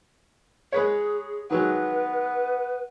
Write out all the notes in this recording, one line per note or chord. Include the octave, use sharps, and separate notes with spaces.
G#3 G#4 B4 C#5
D#3 F#3 G#3 B3 B4